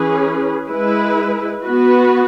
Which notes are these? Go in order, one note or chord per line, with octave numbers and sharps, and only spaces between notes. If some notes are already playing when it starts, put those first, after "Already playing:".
Already playing: E3 C#4 G#4 B4
G#3 E4 B4
B3 F#4 B4